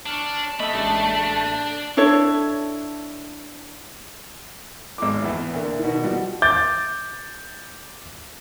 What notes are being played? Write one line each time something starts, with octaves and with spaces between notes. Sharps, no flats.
D4 A5 C#6 F6 F#6
A3 D#5 B5 E6
A1 G#3 D4 D5 E7
D4 E4 A4 C#5
G#1 D6
E2 A2
D2 A#3
B2 D#3
F3 G3 F#4 G4
D6 G6 A6